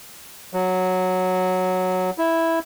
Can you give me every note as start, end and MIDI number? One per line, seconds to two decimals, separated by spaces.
0.54 2.10 54
2.18 2.59 64